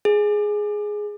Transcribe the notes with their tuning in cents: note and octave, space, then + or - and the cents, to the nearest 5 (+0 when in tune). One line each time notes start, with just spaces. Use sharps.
G#4 +5